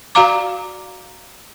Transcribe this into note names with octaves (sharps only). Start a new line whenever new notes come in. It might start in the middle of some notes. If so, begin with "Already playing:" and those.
F#4 D5 F5 A#5 D6